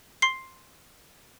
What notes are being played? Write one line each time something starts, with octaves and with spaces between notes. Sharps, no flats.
C6 C7